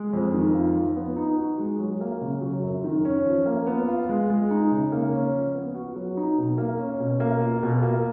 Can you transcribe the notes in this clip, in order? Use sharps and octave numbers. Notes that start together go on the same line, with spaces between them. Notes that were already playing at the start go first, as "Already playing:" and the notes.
Already playing: G#3
F2
D#3
F4
F3
B3
D#4
F#4
G#3
F#3
A#3
C#3
F#3
F#2
D#3
C#4
F3
A#3
B3
F4
G#3
G#3
D#4
C#3
A#3
C#4
F3
B3
F#4
F#3
D#4
B2
A#3
C#4
B2
A#3
F4
B2
A#3